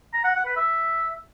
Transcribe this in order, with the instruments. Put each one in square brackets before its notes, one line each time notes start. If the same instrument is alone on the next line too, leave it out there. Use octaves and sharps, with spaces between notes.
[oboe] A#5
F#5
F#5
B4
E5